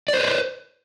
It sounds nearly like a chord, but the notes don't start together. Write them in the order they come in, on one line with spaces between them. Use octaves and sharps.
D5 C5 B4